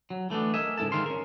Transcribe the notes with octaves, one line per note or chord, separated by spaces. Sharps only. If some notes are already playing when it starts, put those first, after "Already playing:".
F#3
E3 A3 B3 D4
A#4 D#5 E5 G#5
C#2 G#2 E4 A4 A5
D#3 G#3 A#4 F5 C6
C#4 A#4